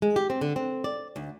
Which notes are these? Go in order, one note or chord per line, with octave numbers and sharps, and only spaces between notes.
G#3
G4
C4
D3
C4
D5
D2